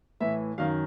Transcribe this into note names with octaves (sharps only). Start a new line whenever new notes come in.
A2 E3 E5
F#2 D#3 F5